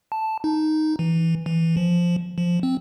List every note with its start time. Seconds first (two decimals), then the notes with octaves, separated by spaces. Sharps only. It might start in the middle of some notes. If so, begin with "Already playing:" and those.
0.12 A5
0.44 D#4
0.99 E3
1.46 E3
1.77 F3
2.38 F3
2.63 C4